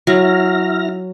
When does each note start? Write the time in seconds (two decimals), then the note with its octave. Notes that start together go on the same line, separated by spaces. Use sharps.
0.07 F#3 E4 F6 A#6